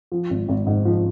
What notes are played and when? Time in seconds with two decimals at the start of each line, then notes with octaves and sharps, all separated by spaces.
0.12 F3
0.30 G#1
0.49 G#1
0.67 G#2
0.85 F3